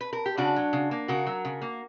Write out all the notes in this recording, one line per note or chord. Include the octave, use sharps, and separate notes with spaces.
B4
A#4
G4
C#3 D4 F#4
F#3
C#3
A#3
C#3 F#4 A#4
F#3
C#3
A#3